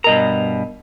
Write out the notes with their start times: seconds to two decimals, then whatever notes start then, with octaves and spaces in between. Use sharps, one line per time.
0.04 G2 B2 A#4 D#5 A#5